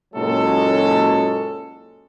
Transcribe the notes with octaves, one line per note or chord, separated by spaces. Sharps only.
F#1 A#2 F#3 G#3 C#4 A4